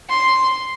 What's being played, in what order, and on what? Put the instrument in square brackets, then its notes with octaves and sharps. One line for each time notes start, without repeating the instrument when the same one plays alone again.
[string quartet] C6